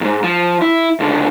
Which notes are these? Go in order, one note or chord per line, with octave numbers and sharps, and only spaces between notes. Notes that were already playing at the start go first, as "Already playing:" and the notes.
D#2 G#2
F3
E4
C#2 D3